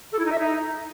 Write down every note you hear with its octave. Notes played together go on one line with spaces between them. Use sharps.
A4
E4
D#4
E5
D#4